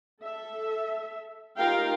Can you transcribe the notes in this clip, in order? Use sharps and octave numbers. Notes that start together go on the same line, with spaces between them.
A4 E5
D#4 F4 G4 A#4 F5 G5